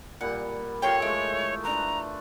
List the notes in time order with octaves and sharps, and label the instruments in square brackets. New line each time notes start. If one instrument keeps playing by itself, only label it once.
[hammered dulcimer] A#2 G3 [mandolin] F#5
[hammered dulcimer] F4 G4 A4 [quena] C#5 [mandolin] G5 A#5 C6
[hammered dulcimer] G#3 A3 [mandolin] E4
[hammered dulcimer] D4 B4 [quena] A#5